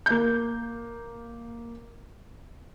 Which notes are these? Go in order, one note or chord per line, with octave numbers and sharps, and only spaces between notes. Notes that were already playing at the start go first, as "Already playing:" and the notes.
A#3 G6